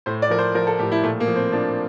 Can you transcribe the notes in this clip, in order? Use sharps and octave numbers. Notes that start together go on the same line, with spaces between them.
A2 C5
D5
F3 A#4
C5
F3 A#4
A4
A2 G4
E4
A#2 A3
A#3
F3
C4
F3 D4